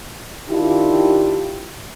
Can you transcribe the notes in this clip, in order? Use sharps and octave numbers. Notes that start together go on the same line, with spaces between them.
D#3 D4 E4 F4 G4